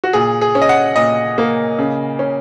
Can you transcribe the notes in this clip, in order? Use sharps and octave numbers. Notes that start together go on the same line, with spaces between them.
F#4
A#2 G#4
G#4
C#4
D#5
F#5
A#2 D#5
A#3
C#3
C#4